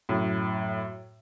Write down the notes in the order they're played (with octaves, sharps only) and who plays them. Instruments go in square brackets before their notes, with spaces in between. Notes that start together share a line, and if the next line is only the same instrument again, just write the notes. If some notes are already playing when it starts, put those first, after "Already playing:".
[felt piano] F#2 A2